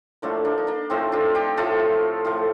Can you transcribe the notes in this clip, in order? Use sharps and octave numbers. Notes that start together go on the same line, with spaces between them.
A2 F3 A3 A#3 D4
A#3 D4
D#4
A#3 D4
A2 F3 A3 C4 D#4
D4 F4
D#4 G4
A2 F3 A3 F4 A4
A2 F3 A3